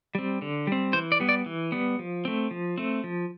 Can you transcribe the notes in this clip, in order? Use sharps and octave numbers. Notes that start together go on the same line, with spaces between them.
G3 C4
D3
G3 C4
E3 C5
D5
G3 B3
D5
E3
G3 B3
F3
A3 C4
F3
A3 C4
F3